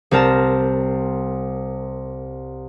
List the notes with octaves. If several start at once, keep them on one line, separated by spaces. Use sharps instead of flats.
C2 C4 A#4 A5